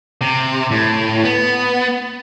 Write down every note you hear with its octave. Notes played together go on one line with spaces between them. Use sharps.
C3
A2
B3